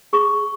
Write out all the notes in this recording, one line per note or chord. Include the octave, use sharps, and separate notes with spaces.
G#4 C#6